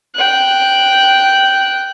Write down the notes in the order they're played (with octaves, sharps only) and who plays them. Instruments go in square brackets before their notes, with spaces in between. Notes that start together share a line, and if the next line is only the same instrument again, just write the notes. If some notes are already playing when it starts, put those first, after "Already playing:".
[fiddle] G5 F#6